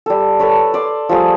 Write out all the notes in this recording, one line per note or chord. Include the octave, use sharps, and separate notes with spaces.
G3 A4
A4 B4 C#5
D5 C6
F3 G3 A3 G#4